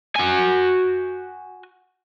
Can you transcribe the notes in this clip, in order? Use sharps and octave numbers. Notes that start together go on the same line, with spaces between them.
F#4 G#5